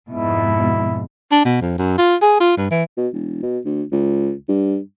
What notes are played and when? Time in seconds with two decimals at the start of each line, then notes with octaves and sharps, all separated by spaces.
0.10 F2 G#2 B2 E4
1.31 D4
1.45 B2
1.61 F2
1.78 F#2
1.98 F4
2.22 G#4
2.40 F4
2.57 G2
2.71 E3
2.97 B2
3.13 E1
3.42 B2
3.65 D2
3.92 C#2
4.49 G2